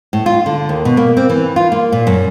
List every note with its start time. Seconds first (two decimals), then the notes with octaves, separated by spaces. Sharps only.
0.13 A2
0.26 F4
0.46 D3
0.69 D#2
0.85 B2
0.97 A#3
1.17 C4
1.29 E3
1.56 F4
1.72 A#3
1.92 A#2
2.07 F#2